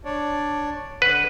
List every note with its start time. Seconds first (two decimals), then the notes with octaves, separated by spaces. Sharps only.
0.05 D4 C#5 D5
1.02 D3 B4 F#5